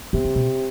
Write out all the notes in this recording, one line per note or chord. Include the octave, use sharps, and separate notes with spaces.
C3 B3
D3
B2